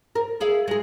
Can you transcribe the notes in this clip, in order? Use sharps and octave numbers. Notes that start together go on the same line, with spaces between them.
A#4
E4 G#4 F5
G#3 G#4